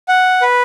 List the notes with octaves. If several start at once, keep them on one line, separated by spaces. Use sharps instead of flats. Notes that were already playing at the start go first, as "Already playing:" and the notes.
F#5
B4